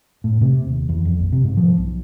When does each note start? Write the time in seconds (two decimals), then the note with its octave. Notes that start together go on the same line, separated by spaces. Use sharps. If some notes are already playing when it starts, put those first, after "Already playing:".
0.24 A2
0.41 C3
0.66 D#1
0.89 E2
1.05 F2
1.20 A#1
1.32 C3
1.44 G#2
1.57 F3
1.78 B1